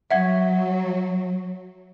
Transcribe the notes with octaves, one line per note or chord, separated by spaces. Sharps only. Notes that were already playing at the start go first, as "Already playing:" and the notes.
F#3 E5 F#5 G#6